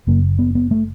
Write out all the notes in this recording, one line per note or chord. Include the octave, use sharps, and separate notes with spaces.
F#1 F#2 C#3 A#3
B3
B3
A3